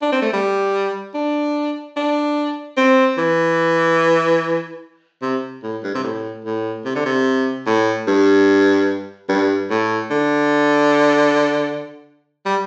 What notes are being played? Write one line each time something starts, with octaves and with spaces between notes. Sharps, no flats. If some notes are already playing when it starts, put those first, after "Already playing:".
D4
C4
A3
G3
D4
D4
C4
E3
C3
A2
G2
C3
A2
A2
C3
D3
C3
A2
G2
G2
A2
D3
G3